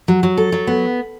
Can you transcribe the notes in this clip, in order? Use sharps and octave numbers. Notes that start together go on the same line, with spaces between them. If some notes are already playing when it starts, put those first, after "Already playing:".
F#3
F#3
A4
F#3
B3